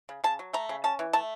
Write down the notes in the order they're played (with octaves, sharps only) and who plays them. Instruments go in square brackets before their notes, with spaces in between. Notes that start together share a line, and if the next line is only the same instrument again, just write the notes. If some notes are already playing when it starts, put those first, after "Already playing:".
[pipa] C#3
C#3 A5
F#3
A3 A#5
C#3
C#4 A5
E3
A3 A5